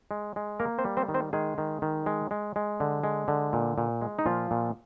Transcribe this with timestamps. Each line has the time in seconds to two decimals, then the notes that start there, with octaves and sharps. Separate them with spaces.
0.11 G#3
0.36 G#3
0.60 A#3 A#4
0.78 C4 C5
0.85 G3
0.97 C4 C5
1.09 D#3
1.14 C4 C5
1.33 D#3 G#3 G#4
1.58 D#3
1.82 D#3
2.06 G#3
2.31 G#3
2.56 G#3
2.80 D3
3.04 G#3
3.28 D3
3.53 A#2
3.78 A#2
4.02 G#3
4.19 D#4
4.26 A#2 F3 F4
4.51 A#2